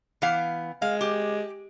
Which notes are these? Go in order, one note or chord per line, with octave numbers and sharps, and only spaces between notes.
E3 B3 F5
G#3 F5
G4